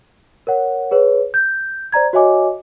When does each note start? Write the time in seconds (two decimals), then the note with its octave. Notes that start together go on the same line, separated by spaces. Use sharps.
0.47 A#4 C#5 F#5
0.91 G#4 B4 C#5
1.34 G6
1.92 C5 D5 A#5 G#6
2.13 F#4 C#5 D#5 E5 G#5 D6